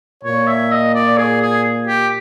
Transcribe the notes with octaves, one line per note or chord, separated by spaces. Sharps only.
A#2 C#5
E5
D#5
D5
G#4
G#4
G4